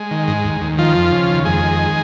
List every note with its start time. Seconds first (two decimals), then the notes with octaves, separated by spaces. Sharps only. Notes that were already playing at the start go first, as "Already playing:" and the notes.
Already playing: G#3
0.11 D#3
0.27 G#2
0.44 D#2
0.61 D#2
0.78 D#3 F3 F4
0.95 F2
1.12 C#3
1.28 D#2
1.45 F2 G#3 G#4
1.63 D#3